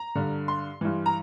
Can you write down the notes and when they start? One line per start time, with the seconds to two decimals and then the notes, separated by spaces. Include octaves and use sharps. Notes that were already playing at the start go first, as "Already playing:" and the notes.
Already playing: A#5
0.15 G2 D3
0.48 C6
0.81 G2 E3
1.06 A#5